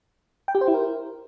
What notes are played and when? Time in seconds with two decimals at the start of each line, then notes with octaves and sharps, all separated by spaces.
0.48 G5
0.55 G4
0.61 C5
0.68 E4
0.74 A#4